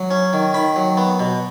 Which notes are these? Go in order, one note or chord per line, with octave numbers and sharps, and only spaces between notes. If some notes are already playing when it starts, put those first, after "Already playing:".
Already playing: F#3
C#4
D#3
D#3 B5
F#3
B3
B2